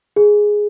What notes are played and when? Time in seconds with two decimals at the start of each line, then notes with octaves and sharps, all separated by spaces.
0.16 G#4